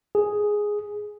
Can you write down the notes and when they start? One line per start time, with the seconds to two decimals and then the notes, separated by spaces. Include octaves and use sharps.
0.15 G#4